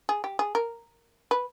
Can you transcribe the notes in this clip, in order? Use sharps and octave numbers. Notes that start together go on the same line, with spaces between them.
G#4
G4
G#4
A#4
B4